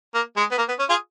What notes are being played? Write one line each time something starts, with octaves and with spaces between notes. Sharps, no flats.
A#3
G#3
B3
A#3
B3
C#4
F4 G#4